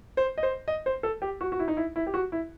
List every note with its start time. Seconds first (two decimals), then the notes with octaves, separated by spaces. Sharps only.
0.17 C5
0.38 D#5
0.43 C5
0.68 D#5
0.86 C5
1.03 A4
1.22 G4
1.41 F#4
1.52 F#4
1.59 E4
1.68 D#4
1.77 E4
1.96 E4
2.07 G4
2.14 F#4
2.32 E4